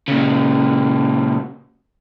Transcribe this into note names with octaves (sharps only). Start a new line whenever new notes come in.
A#2 C#3